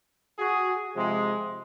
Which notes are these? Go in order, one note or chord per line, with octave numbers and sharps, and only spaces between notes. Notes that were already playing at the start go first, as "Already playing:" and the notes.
F#4 G#4
C3 F3 G#3